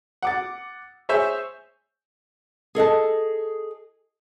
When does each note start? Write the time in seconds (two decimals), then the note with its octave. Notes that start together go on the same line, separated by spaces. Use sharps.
0.23 F#5 D6 A6
1.09 G#4 C5 C#5 E5 G#5 G6
2.75 G#4 A4 D#5 A5